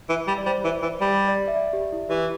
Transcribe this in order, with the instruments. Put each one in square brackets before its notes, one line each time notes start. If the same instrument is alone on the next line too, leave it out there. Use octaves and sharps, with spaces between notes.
[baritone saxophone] E3
G3
[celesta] D5
[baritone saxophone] G3 [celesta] C5
[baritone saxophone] E3
E3
[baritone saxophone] G3 [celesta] D5
[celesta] D5
E5
D5
G4
E4
[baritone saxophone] E3 [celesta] G4